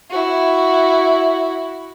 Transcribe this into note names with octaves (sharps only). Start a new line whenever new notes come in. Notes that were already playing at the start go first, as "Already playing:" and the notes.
E4 F#4